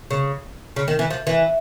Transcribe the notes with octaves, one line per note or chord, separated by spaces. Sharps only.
C#3
C#3
D#3
E3
F3
E3